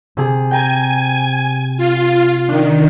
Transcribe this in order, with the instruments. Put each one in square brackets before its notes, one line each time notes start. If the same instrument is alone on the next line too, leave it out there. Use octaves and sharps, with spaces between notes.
[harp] C3 G#4
[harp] G5 A#5 [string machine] G#5
[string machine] F4
[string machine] D#3 [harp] D4